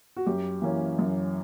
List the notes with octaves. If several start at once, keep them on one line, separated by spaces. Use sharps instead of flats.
F#4
F#2 G4
E3 A#3 C#4
F#2